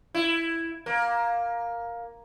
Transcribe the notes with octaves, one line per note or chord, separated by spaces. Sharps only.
E4
A#3